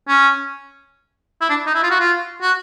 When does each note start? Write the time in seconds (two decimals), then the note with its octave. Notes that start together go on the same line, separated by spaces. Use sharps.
0.08 C#4
1.41 E4
1.50 D4
1.67 D#4
1.75 E4
1.83 F4
1.91 F#4
2.00 F4
2.41 F#4